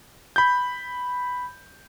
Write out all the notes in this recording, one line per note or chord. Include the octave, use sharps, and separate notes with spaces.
B5 G6